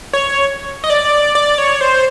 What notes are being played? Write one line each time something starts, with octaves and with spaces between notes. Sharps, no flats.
C#5
D#5
D5
D5
C#5
C5